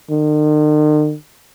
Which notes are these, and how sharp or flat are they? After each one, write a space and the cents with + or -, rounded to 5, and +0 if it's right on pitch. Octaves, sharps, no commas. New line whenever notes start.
D#3 -45